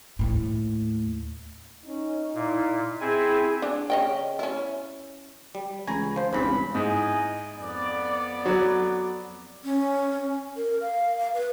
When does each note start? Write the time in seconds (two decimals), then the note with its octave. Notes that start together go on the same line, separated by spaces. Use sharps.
0.19 D#2 A2
1.85 C#4 D#4
2.35 A#2 E4
3.01 C4 E4 G#4 G#5
3.62 D4
3.90 C#3 D#5 G5
4.39 C#4 E4
5.55 G3
5.87 C#2 E3 G#5 A#5 B5
6.16 F3 C5
6.33 G#1 E2 G2 C#3 C4 C#4 C5 B5
6.75 G#2 E4 D#5 G#5
7.58 F2 B3 D5
8.45 F#3
9.64 C#4
10.57 A#4
10.81 F5
11.17 F5
11.34 B4